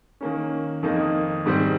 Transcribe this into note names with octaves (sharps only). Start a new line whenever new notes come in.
D#3 A#3 C#4
F2 D#3 A#3 D#4
G#2 D#3 G3 C4